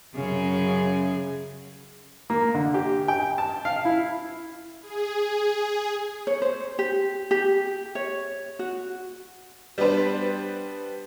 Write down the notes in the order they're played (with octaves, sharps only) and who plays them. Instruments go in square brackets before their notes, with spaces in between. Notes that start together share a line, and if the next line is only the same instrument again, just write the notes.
[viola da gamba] F#2 C#3 G#4
[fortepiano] A#3
D3
G4
G5
A5
F5
E4
[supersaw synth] G#4
[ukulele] C#5
C5
G4
G4
C#5
F#4
[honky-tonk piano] G3 B3 D4 B4 C5